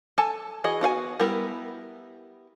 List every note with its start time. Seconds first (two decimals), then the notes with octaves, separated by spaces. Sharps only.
0.18 A4 G#5 A5
0.64 E3 F#4 G#4 D#5
0.81 B3 F#4 F5 G#5
1.20 G3 B3 E4 A#4